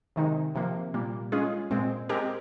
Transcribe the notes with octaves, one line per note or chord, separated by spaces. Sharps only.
C3 D#3 G#3 D#4
C3 F3 A#3
A#2 G3 A#3
G#3 C#4 F4 G#4
A#2 G#3 C4
G#3 C4 G4 A#4